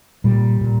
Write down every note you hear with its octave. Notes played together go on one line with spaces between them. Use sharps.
A#2 G3
A#2